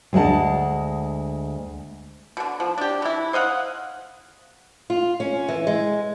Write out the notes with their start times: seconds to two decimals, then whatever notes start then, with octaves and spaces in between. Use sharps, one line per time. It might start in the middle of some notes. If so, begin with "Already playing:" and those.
0.13 D2 G#3 C#5 F#5 A5
2.37 B2 D3
2.60 F3
2.78 D4 G4
3.02 E3 E4
3.33 C5 D#5 F5 F#5
4.90 F4
5.20 C#4
5.49 E3
5.67 G#3